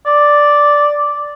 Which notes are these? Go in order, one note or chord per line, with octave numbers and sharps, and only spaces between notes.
D5